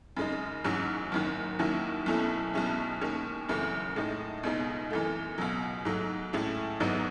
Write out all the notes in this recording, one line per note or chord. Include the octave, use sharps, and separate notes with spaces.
F#2 C#3 G#3 D#4
A1 G#2 F#3 C#4
F#1 F#2 D#3
D#2 D#3 F#3 C#4 E4
B1 B2 A3 C#4 E4
B1 B2 G#3 C#4 E4
D#2 D#3 G#3 C#4
F#1 F#2 C#3 E3 A3
A2 G#3 D#4
C#2 B2 G#3 D#4
F#2 E3 A3
C#2 B2 F#3
G#2 F#3 A3
A2 G#3 C#4 E4
G#1 G#2 F#3 B3 D#4